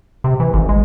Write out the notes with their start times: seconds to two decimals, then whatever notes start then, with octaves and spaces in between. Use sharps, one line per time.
0.24 C3
0.40 E3
0.54 G#1
0.69 G#3